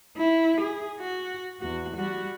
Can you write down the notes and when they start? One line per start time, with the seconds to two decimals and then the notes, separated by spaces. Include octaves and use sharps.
0.17 E4
0.61 G#4
0.99 F#4
1.60 E2 F#4
1.96 G3 F#4